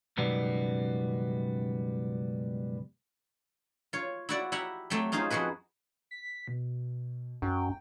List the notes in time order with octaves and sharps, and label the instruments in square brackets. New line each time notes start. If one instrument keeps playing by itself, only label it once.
[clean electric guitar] C#2 F#2 B2 D#3 G3 B3
[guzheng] F4 C#5
E4 F#4 D5
E4 G4 E5 F#5 A#5
F#3 A3 C4 G4
C#4 D#4 F4 G#4 C5
F2 F3 F#4 G#4 B4
[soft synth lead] B6
B2
[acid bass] F#2 [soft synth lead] G5